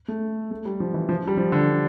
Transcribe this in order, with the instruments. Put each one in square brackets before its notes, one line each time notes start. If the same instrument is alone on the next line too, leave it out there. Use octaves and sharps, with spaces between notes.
[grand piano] A3
A3
G3
F3
E3
F3
G3
F3
D3